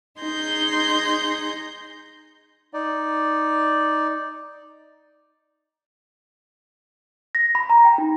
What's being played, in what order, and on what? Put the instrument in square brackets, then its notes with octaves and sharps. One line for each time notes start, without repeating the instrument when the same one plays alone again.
[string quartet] D#4 G#4 C6 G6 A#6
[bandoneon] D#4 D5
[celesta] A#6
B5
A#5
G5
D#4